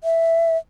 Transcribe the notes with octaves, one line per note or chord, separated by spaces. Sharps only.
E5